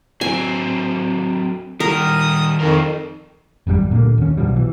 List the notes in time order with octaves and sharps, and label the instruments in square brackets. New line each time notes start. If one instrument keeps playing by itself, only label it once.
[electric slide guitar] F#3 C4 [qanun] G#5
[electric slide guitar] D#3 G3 G4 [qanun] A#4 [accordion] D#6
[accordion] F2 D#3 [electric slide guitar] D#4 F4 A#4
[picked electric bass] G#1 F#2 C3 G3
A#2 D3 A3 A#3
D#2 C#4
B1 B2 F3 G3
E3